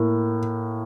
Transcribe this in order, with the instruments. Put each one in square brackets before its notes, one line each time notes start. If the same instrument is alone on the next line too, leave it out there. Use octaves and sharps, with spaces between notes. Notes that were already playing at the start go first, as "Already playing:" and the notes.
Already playing: [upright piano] A2 A#3